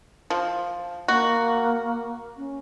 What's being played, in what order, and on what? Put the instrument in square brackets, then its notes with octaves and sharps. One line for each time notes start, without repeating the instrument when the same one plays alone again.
[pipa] F3
[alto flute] A#3 [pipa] F#4
[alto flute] C#4